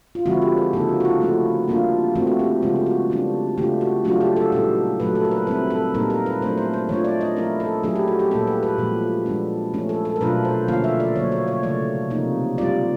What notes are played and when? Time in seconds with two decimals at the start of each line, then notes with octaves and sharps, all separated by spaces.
0.15 F4
0.26 D3 F3 G#3 C4 E4 F#4
0.42 G4
0.58 G#4
0.73 C#3 F3 A#3 D#4 A4
0.89 F#4
1.00 F#4
1.05 F4
1.21 F3 A3 C#4 E4
1.68 G3 A#3 D4 F4
2.15 E3 A3 C4 F4 F#4
2.27 F#4
2.39 G4
2.62 C#3 F3 G#3 C#4 F4
2.76 F4
2.86 F#4
3.10 E3 G3 B3 D4
3.58 C#3 E3 A3 D4 F4 G4
3.81 F#4
4.04 F#3 A3 D4 F4 F#4
4.21 G4
4.37 A4
4.52 A#2 G3 B3 D#4 A4
5.00 A#2 F#3 A3 B4
5.15 A4
5.24 A#4
5.31 B4
5.47 G3 C4 E4 B4
5.70 A4
5.94 A#2 G3 A#3 D#4 A#4
6.10 A#4
6.26 B4
6.42 F#3 A3 D4 C5
6.58 C5
6.74 C5
6.89 E3 A3 D4 F4 C#5
7.05 D5
7.21 D#5
7.37 F3 A3 C#4 E4 A#4
7.60 A4
7.83 F#3 A3 C#4 E4 G#4
7.96 G4
8.08 F#4
8.19 G4
8.31 A#2 G3 A#3 C#4 A4
8.47 B4
8.63 B4
8.78 A#2 F3 G#3
9.26 F3 G#3 B3 D4
9.74 F3 A3 C#4 E4
9.89 A4
10.05 A4
10.16 A#4
10.21 B2 F#3 A3 D4 F4 B4
10.45 C5
10.68 D3 F3 A#3 C#4 F4 F5
10.84 E5
11.00 D5
11.16 D3 F#3 A#3 C#5
11.32 C#5
11.47 C#5
11.63 C#3 E3 A3 D5
12.10 C3 F3 A#3 D#4
12.58 G3 C4 F4 D5